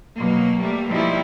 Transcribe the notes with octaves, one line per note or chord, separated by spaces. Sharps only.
B2 F#3 A#3
G3 A3 A#3
B2 F3 G3 A3 D#4 E4